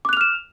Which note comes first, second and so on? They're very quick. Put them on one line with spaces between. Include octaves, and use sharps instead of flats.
D6 F#6 F7 F6 E7